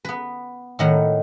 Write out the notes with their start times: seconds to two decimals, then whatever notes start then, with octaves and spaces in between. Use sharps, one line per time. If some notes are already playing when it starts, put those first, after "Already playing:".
0.05 B3 B4
0.79 A2 D#3 F#5